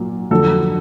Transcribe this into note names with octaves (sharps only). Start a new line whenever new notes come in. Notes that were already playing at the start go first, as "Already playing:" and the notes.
Already playing: A#2 F#3 A#3
F2 D3 F#3 A4